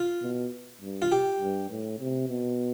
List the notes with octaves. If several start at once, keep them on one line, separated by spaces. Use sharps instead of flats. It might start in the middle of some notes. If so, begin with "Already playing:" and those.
Already playing: F4
B2
G2
F4
G4
G2
A2
C3
B2